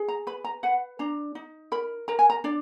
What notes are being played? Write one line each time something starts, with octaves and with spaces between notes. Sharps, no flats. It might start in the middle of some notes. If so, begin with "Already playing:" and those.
Already playing: G#4
A#5
B4 B5
A#5
B4 F#5
D4 A#5
D#4
A#4 B5
A#4 A#5
G#5
A#5
D4 D5